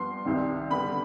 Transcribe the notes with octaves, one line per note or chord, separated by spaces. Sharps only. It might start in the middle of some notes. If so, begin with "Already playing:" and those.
Already playing: G2 F3 B3 C6
C2 C3 D#3 G3
G2 D3 G3 B3 B5